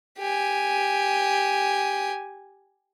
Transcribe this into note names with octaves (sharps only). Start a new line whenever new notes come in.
G4 G#5